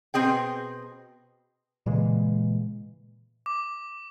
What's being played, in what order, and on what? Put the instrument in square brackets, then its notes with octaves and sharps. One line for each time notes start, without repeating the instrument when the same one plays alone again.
[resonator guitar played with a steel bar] B2 C4 G#4 G5
[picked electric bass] A#2 C#3 E3 G#3
[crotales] D6